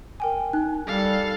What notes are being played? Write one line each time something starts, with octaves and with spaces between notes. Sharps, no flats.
A#4 G5 G#5
D#4 F#6
G3 A4 F5